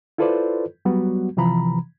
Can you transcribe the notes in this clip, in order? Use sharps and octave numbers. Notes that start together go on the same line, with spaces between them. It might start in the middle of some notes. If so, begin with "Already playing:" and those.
E4 F4 A4 B4 C5 D5
F#3 G3 B3 F#4
C3 E3 F3 A#5 B5